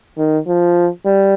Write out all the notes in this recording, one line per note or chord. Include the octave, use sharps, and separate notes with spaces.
D#3
F3
G3